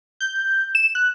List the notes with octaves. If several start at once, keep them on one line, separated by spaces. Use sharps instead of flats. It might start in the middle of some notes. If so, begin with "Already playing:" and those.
G6
E7
F#6